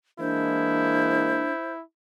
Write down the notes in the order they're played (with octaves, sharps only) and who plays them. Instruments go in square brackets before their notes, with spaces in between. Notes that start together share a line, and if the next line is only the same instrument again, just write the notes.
[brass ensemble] E3 G#3 A#3 [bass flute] D4 [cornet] E4 [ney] C5